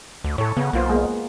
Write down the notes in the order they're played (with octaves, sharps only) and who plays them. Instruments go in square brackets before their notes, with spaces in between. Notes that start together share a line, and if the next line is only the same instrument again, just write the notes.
[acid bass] D2
[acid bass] A2 [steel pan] A4 C#5
[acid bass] C#3 [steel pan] B3
[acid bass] B1 [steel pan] A#3 F4 C5
[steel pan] G#3 A#3 B3